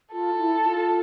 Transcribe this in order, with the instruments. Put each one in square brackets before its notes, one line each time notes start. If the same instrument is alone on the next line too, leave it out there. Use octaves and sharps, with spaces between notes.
[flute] F4 [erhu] A4
[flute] E4
F4